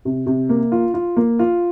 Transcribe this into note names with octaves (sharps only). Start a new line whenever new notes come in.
C3
C3
A#3
F4
F4
A#3
F4